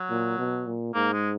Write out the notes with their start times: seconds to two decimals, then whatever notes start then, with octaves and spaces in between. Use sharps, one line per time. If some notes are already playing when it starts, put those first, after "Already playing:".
Already playing: F#3
0.10 A#2
0.39 B2
0.66 A#2
0.95 G#2 A#3
1.13 G#3